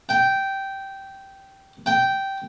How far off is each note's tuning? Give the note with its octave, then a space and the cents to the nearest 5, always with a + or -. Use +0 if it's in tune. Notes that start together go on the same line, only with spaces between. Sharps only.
G5 -10
G5 -10